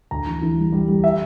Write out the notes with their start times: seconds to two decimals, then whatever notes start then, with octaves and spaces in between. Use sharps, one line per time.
0.11 D2 A#5
0.27 E3
0.42 E3
0.58 G3
0.72 G3
0.88 G3
1.04 E5